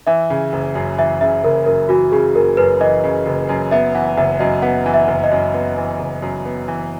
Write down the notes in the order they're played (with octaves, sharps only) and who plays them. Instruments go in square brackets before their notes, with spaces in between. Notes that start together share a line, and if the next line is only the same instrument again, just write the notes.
[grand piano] E3 [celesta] E5
[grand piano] C#3
F#1
F#2
[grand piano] E3 [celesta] E5
[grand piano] C#3 [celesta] E5
[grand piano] F#1 [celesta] A#4
[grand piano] F#2 [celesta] A#4
[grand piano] E3 [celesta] F#4
[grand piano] C#3 [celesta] G#4
[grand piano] F#1 [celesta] A#4
[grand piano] F#2 [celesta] B4
[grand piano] E3 [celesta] D#5
[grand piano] C#3
F#1
F#2
[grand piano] B3 [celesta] E5
[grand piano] E3 [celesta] F#5
[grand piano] F#1 [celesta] E5
[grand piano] F#2 [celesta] D#5
[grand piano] B3 [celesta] F#5
[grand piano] E3
[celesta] E5
[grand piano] F#1
[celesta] D#5
[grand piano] F#2
B3
E3
F#1
F#2
B3
E3